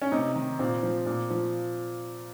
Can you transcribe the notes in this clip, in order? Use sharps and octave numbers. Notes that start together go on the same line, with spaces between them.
C#4
C3 D#4
D#3
A#2 C4
F3
A#2
F3